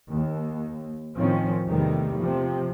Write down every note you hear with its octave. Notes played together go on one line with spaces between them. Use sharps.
D#2
A2 D#3 F3 C4 C#4
E2 C3 D#3 G3 A3
C3 F3